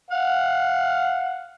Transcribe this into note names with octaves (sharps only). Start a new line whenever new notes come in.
F5 F#5